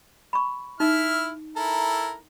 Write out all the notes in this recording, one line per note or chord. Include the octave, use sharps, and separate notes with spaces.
B5 C#6
D#4 E4 E5 F6
E4 A4 A#4